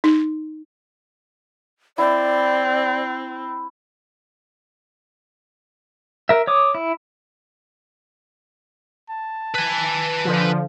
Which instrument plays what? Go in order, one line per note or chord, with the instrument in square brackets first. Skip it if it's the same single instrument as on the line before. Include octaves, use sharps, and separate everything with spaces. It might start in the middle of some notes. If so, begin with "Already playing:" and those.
[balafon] D#4
[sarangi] C4 [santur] E4 [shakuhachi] D5
[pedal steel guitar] A#4 E5
C#5 D6 D#6
E4
[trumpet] A5
[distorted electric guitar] B4 G#5
[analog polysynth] D3 F3